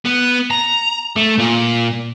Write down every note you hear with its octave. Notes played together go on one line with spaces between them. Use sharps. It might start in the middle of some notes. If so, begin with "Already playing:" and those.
B3
A#5
A3
A#2